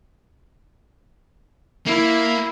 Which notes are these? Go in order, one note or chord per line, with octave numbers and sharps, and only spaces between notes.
A#3 E4